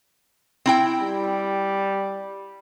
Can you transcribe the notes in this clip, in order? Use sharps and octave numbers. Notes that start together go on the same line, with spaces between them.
C4 E4 G5
G3